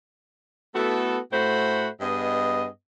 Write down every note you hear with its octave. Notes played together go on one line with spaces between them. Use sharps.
A3 B3 E4 F#4 A4
A2 A3 F#4 C5 F#5 B5
G2 B3 G#4 D#5